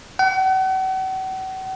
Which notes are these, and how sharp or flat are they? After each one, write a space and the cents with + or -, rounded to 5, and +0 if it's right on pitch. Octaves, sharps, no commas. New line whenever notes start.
F#5 +40